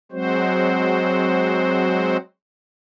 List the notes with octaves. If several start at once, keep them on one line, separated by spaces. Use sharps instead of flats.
F#3 G#3 C4 F#4 C5